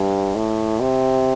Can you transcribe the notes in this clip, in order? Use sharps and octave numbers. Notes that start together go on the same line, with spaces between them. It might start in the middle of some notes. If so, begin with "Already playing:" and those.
Already playing: G2
A2
C3